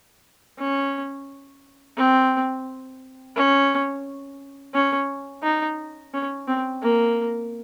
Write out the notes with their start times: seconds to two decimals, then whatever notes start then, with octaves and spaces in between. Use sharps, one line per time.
0.58 C#4
1.97 C4
3.36 C#4
4.74 C#4
5.43 D#4
6.14 C#4
6.48 C4
6.82 A#3